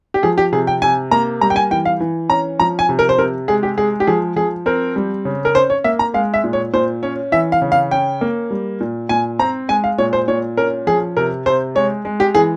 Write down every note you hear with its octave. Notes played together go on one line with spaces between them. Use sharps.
G4
F3 G#4
G4
C3 G#4
G5
C3 G#5
A#3 A#5
G3 A#5
G5
G#5
E3 G5
F5
E3
C#4 A#5
F3 A#5
G#5
C3
A#4
C5
C3 A#4
G#3 G#4
G4
G#3 G#4
G4
F3 G#4
F3 G#4
C4 A#4
G3
C#3
A#4
C#4 C5
C#5
A#3 E5
A#5
G#3 F5
E5
A#2
C#5
A#2 C5
C#4 C#5
E3 E5
F5
C#3
F5
C#4 G5
A#3
G3
A#2
A#2 G#5
C4 A#5
G#3 G#5
F5
A#2 C#5
C5
A#2 C#5
C#4 A#4
F3 G#4
C3 A#4
C3 C5
G#3 C#5
G#3
G4
E3 G#4